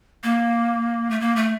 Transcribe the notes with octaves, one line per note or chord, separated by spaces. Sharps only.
A#3
A3
A#3
A3